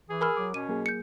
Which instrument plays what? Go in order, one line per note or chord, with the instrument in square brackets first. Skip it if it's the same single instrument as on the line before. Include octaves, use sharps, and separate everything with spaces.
[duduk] E3 [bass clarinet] G#4
[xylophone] A#4 B5 F6 [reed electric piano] G#5 E6
[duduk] F#3 [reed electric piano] D6
[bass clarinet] B2 [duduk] C#4 [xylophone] D#7
[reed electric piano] F#3 A#3 G#4
[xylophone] G6 C#7